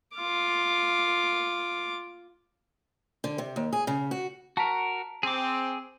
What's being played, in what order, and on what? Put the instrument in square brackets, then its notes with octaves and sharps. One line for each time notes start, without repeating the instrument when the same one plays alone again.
[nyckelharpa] F4 D6
[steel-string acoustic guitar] D3
C3
D#2
G#4
C#3
F#4
[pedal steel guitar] F#4 A#4 [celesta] A5 A#5 B6
[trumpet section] C4 [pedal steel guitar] G#4 D6